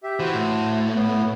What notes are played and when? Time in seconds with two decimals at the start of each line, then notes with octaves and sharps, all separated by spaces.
0.03 G4 E5
0.20 E3 F#4 C5
0.33 A2
0.95 B3